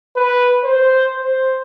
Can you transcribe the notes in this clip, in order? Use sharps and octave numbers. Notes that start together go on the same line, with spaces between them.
B4
C5
C5